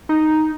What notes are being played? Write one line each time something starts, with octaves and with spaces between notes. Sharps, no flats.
D#4